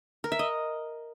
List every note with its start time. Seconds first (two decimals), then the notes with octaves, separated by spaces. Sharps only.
0.24 A#4
0.32 E5
0.39 D#5